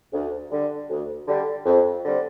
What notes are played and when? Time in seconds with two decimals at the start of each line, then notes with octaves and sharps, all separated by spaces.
0.13 D2
0.51 D3 G3
0.89 D2
1.28 D3 G3
1.66 F2
2.05 D3 G3 C4